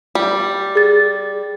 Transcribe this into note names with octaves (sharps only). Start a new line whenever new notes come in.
G3
G#4 A6